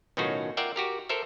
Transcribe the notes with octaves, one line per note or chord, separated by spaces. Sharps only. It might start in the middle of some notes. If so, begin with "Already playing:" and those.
B1 A2 D#3 C#4 F4 F#4
F4 A#4 D5 E5 F#5 G5
F#4 G4 A#4
A4 A#4 C5 E5